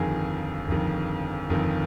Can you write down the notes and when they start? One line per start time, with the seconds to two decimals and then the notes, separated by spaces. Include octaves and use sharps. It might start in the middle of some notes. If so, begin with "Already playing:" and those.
Already playing: G1 F2 D#3 G#4
0.68 G1 F2 D#3
1.50 G1 F2 D#3